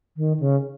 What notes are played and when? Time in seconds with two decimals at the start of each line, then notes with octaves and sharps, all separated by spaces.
0.17 D#3
0.40 C#3